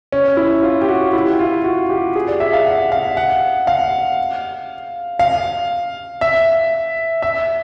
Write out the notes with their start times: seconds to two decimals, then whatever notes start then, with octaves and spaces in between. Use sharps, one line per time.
0.12 C#4
0.37 E4
0.63 F4
0.81 G4
0.88 F#4
1.13 E4
1.39 F4
1.64 F#4
1.89 G4
2.16 G#4
2.28 D5
2.40 E5
2.53 F5
2.66 F#5
2.92 F5
3.17 F#5
3.67 F5
5.19 F5
6.21 E5
7.22 E5